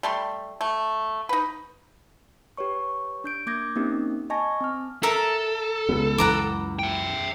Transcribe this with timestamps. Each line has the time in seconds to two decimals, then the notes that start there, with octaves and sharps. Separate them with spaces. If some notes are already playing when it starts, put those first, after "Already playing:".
0.03 G3 A3 C6
0.61 A3
1.29 D#4 B4
2.57 G4 B4 C#5 C#6
3.24 D4 G6 D7
3.47 A#3 D6 G6 G#6 A#6
3.76 A#3 C4 C#4 D#4 G4
4.30 D#5 G#5 A5 C#6 G#6 A#6
4.61 C4 F6
5.03 A4 A#4 E5 A#5
5.89 C#2 G#3 B3
6.18 F#2 E3 F#5 A#5 D6
6.79 E5 G5